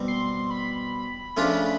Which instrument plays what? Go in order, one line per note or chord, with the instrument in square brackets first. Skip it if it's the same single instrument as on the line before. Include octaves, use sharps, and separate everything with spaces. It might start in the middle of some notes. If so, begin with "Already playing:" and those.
Already playing: [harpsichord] B2 G3 C4
[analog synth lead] C6
B5
[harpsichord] C#3 F3 A3 D4 F4